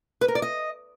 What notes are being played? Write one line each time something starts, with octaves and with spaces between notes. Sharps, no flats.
B4
A#4
D5
D#5